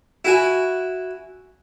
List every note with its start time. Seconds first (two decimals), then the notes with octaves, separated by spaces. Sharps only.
0.25 E4 F#4 G#5